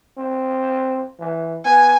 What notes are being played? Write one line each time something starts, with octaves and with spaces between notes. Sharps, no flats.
C4
E3
B3 G#5